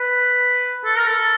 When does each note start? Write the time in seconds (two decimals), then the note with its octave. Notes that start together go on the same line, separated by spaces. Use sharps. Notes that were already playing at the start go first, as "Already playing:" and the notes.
Already playing: B4
0.85 A4
0.97 A#4
1.07 A4